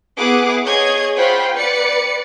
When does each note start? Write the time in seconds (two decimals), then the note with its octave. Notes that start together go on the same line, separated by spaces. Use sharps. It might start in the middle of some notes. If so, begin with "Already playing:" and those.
0.18 B3 E4 G#4 F#5 D6
0.67 G#4 C#5 D#5 G#6
1.17 F4 C5 F#5 G5 B5
1.54 B4 D5 C#7